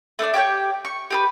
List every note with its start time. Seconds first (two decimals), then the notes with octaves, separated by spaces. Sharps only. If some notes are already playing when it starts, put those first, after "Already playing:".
0.19 A3 D4 B4 D5
0.34 G4 C#5 F#5 G5
0.85 C#6
1.10 G4 G#4 B4